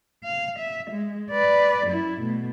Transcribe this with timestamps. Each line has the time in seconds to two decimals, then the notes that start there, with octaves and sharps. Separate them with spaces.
0.24 F5
0.59 E5
0.91 G#3
1.31 B4 D5
1.87 F#2 E4
2.20 B2 A3